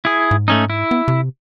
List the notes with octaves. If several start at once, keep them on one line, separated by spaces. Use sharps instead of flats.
E4 G#4
G#2
A3 C#4 D#4
E4
B3
C3